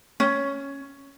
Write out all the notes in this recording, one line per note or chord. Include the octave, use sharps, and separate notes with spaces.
C#4